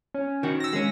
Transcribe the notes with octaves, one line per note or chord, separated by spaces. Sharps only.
C#4
D#3 F#4
E6 A#6
G#3 C#4